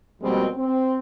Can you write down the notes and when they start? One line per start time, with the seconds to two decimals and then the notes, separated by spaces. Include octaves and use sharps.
0.22 B2 F3 G3 G#3 A#3 C4
0.56 C4